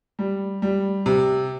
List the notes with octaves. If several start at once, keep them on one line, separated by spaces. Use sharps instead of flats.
G3
G3
C3